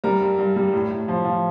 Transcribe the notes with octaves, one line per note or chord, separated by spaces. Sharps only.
G3 A#4 A#5
G2
G2
G3
A2
A2
F3
F3